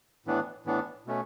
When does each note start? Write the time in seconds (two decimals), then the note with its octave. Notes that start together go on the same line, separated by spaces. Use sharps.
0.26 A2 E3 B3 D4
0.66 A2 E3 B3 D4
1.06 B2 A3 C#4